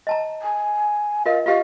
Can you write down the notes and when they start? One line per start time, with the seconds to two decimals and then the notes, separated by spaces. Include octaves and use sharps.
0.07 D#5 A5 A#5
0.42 G#5
1.26 F4 A#4 D#5 F5
1.46 F4 G4 D#5 F5